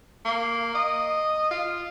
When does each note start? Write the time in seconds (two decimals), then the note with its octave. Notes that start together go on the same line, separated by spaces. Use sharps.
0.25 A#3
0.75 D#5
1.51 F4